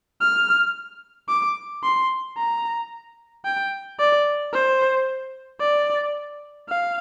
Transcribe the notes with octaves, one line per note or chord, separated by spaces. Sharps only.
F6
D6
C6
A#5
G5
D5
C5
D5
F5